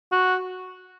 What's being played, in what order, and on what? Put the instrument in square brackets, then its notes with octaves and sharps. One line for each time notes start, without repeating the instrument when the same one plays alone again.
[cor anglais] F#4